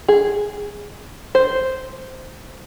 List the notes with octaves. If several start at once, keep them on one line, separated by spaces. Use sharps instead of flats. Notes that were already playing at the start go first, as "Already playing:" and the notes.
G#4
C5